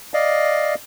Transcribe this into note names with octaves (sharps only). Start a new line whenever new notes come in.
D5 D#5 F5